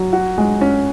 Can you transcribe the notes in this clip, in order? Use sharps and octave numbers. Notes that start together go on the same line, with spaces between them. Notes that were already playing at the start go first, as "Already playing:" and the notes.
Already playing: F#3
F#4
G#3
C#4